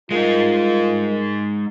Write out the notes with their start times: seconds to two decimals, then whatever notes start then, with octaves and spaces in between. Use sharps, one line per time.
0.11 G3 G#3 D#4 F4 A#4 D#5